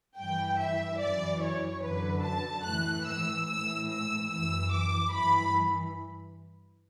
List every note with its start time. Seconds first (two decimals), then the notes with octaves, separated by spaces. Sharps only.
0.17 G2 E3 G5
0.58 E5
1.00 F#2 E3 D5
1.42 C#5
1.83 F#2 D3 B4
2.24 A5
2.65 A2 E3 F#6
3.07 E6
3.47 A2 E3 E6
3.89 E6
4.30 F#2 E3 E6
4.71 D6
5.13 G2 E3 B5